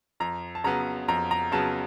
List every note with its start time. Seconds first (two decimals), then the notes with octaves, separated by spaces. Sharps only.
0.20 F2 A#5
0.55 A5
0.64 C#3 F#3 B3 A#5
1.08 F2 A#5
1.31 A#5
1.52 C#3 F#3 B3 A5